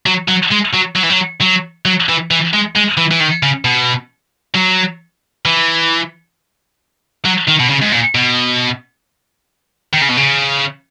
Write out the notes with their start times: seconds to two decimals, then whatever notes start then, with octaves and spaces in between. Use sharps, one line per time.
0.06 F#3
0.28 F#3
0.51 G#3
0.73 F#3
0.95 F#3
1.03 E3
1.10 F#3
1.41 F#3
1.85 F#3
2.09 E3
2.31 E3
2.53 G#3
2.76 G#3
2.97 E3
3.11 E3
3.20 D#3
3.43 C#3
3.65 B2
4.55 F#3
5.46 E3
7.25 F#3
7.48 D#3
7.59 B2
7.70 C#3
7.81 G#2
7.92 A#2
8.15 B2
9.94 D#3
10.02 C#3
10.09 B2
10.17 C#3